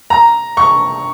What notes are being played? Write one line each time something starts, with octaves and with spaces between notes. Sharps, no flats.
A#5
C#6